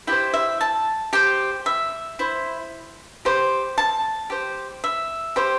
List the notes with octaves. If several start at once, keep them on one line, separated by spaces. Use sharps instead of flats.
E4 G4 C5 G5
E5
A5
G4 C5 G5
E5
E4 C5
G4 C5
A5
G4 C5
E5
G4 C5